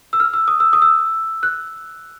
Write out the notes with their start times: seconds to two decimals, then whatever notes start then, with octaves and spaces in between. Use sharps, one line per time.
0.13 E6
0.20 F6
0.33 E6
0.48 D#6
0.60 E6
0.73 D#6
0.82 E6
1.43 F#6